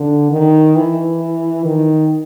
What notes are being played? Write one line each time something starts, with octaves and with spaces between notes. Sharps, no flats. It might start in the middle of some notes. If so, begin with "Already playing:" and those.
Already playing: D3
D#3
E3
D#3